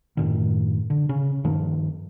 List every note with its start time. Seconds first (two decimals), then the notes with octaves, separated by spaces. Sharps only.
0.17 F#2 A2 D#3
0.90 D3
1.09 C#3
1.44 G2 D#3 F3